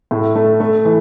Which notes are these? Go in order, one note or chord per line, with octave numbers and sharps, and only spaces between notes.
A2
A3
A3
E3